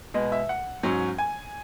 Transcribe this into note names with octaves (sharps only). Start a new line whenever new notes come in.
B2 G#3 B3 D#5
E5
F#5
G#2 F#3 C#4
G#5